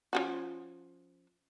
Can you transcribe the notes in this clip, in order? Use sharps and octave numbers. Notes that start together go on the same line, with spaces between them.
F3 C#4 F#4